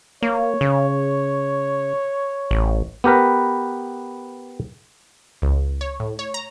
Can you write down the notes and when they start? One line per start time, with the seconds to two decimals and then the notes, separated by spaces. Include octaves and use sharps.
0.22 A#3 C#5
0.61 C#3
2.51 A1
3.04 B3 G4 A#4 B4
5.42 C#2
5.81 C#5
6.00 A2
6.19 C#5
6.34 A#5